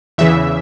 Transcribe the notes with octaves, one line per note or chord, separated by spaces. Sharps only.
E2 C#3 E3 E5